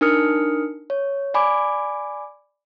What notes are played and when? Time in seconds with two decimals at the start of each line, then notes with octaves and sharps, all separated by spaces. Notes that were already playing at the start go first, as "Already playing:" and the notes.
0.01 D4 D#4 A#4 D#6 F6 C#7
0.90 C#5
1.34 D5 G#5 B5 D6